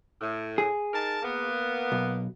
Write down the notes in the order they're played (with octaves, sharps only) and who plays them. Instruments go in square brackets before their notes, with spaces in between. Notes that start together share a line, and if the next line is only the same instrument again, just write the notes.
[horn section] A2
[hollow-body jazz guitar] G#4
[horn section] D#4 A#4 A5
A#3 B3
[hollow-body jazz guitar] B1